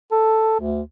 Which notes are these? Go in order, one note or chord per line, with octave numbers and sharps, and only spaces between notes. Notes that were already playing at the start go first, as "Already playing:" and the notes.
A4
D2